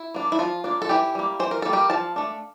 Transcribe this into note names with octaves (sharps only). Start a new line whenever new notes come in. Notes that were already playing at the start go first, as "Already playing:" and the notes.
Already playing: E4
A#3 D4
E4
F3 F4
A#3 D4
A4
E3 E4 G4
G3 A#3
E3 C5
A#4
G3 A#3 A4
G4 A#4
F3 F5 A5
A3 D4